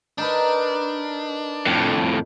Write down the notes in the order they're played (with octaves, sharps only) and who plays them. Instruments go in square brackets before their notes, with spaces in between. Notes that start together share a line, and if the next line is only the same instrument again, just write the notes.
[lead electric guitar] D4 [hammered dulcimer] D#4 A#4 B4
[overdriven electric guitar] F2 A2